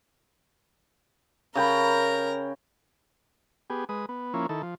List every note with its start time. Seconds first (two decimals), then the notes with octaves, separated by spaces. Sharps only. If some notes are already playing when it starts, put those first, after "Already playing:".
1.55 C#3 A#4 G5 A#5 B5
3.70 B3 G4 G#4
3.89 G#3 B4 D#6
4.09 B3
4.34 F3 A#3 C#4 E4
4.49 D#3 E4 A4
4.63 F3